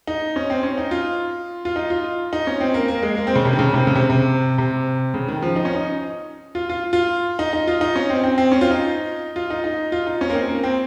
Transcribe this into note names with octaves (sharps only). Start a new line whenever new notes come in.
D#4
C#4
C4
C#4
D#4
F4
F4
D#4
F4
D#4
C#4
C4
A#3
A#3
G#3
A#3
C4
C#3
C3
D#3
C#3
C3
C#3
C3
C3
C3
C#3
D#3
F3
D#4
C#4
D#4
F4
F4
F4
D#4
D#4
F4
D#4
C#4
C4
C4
C4
C#4
F4
D#4
F4
D#4
D#4
F4
D#4
C#4
A#3
C4
A#3
C4